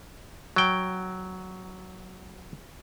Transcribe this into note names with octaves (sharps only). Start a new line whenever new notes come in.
F#3 G5